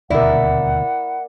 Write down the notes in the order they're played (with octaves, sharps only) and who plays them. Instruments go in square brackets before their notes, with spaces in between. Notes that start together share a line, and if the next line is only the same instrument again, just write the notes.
[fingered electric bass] D#1 D2 B2 [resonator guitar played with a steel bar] E4 [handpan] A#4 D5 [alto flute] F#5